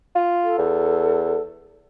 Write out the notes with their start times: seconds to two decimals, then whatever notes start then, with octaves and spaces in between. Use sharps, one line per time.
0.15 F4
0.44 A4
0.58 E2